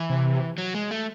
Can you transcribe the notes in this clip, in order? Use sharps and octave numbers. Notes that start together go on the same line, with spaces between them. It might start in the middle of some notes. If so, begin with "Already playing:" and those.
Already playing: E3
C3
F#3
G#3
A3